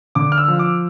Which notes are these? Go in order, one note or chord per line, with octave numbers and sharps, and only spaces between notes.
D3 D6
F6
E6
F3
D6